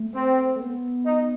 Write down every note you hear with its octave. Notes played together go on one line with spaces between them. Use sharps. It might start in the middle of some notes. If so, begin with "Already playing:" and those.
Already playing: A3
C4
A3
B3
D#4